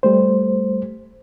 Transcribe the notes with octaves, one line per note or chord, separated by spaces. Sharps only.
G3 A3 C5